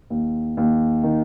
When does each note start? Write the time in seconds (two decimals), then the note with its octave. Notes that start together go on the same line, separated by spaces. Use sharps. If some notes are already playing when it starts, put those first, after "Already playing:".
0.10 D#2
0.57 D#2
1.03 D#3